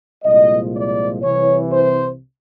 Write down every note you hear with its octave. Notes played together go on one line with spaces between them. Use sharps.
C2 A#2 F3 G#3 D#5
D5
C2 C3 E3 C#5
C5